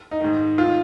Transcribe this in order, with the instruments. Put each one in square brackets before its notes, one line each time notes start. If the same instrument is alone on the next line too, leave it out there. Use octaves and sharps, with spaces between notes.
[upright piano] D#4
G#2 D#3
D#3 F4